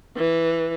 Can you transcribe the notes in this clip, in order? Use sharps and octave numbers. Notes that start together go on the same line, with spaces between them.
E3